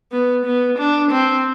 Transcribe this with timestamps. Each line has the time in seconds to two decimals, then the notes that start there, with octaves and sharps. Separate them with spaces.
0.12 B3
0.46 B3
0.79 D4
1.12 C4